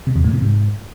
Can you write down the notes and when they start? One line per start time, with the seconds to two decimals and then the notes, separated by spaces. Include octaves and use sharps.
0.07 C3
0.16 E2
0.24 A2
0.33 C3
0.42 G#2